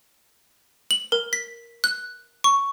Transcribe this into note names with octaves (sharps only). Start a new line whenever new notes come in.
F#7
A#4
B6
F#6
C#6